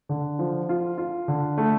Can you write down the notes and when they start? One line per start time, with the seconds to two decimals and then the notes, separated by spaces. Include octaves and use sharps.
0.09 D3
0.39 F3
0.69 F4
0.98 F4
1.28 D3
1.57 A3